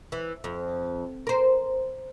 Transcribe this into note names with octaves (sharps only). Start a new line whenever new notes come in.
E3
F2
A#4 C5